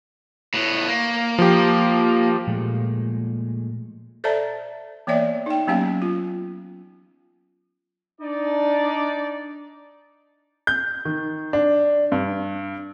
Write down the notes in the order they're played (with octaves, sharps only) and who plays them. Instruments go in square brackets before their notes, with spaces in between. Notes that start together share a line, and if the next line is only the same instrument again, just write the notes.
[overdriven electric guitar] A2 B3
A#3
[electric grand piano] F3 G4
[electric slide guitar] A#2 F3 G#3 A3
[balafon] A4 C5 D5 E5 A5 A#5
E3 A#3 B3 C#5 D5 E5
D#4 G5
F#3 A#3 B3 C#4 G4 F5
F4
[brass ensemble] D4 D#4 D5
[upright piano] G6
D#3
D4
G2